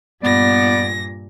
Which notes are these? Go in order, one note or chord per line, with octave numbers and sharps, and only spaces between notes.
G2 A#2 B3 D5 A#6